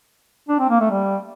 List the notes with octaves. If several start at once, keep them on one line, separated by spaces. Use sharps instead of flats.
D4
C4
A#3
A3
G3